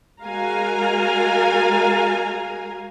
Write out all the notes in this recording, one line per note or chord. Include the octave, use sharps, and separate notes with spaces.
G#3 F#4 A#4 F5 G#5 A#5